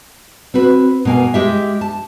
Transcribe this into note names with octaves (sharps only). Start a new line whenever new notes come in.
C4 F#4 B4
B2 A#3 G#5
G#3 G4 E5
A5